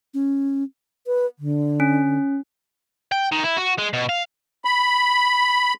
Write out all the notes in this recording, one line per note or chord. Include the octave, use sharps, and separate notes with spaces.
C#4
B4
D3
C#4
G5
D#3
E4
F#4
G#3
B2
F5
B5